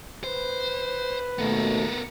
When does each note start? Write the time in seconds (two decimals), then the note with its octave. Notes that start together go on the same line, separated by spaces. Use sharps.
0.24 B4 C5
1.39 D#2 B2 A3 B3 A#4